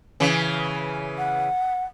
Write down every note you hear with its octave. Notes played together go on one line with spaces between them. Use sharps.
C#3 E3
F#5